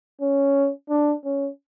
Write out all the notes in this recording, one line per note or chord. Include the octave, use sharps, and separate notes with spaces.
C#4
D4
C#4